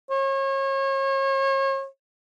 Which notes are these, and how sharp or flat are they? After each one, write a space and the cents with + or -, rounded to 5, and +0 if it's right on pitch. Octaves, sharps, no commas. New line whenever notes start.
C#5 -35